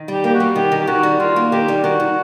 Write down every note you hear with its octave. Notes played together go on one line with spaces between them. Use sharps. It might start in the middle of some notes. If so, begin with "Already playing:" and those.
Already playing: D#3
G3 G4
A#3 G4
F#4
G3
D#3 G4
D#3
G4
D#3 F#4
G3
D#3 F4
A#3
D#3 G4
G3
D#3 F#4
D#3